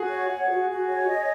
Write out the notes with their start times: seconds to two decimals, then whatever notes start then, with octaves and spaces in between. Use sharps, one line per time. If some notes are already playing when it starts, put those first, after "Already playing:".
Already playing: F#4 G#4
0.09 C#5
0.28 F#5
0.49 F#4
0.68 F#4
0.89 C#5
1.08 D#5